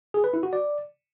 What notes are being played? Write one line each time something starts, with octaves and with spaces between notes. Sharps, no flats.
G#4
B4
E4
F#4
D5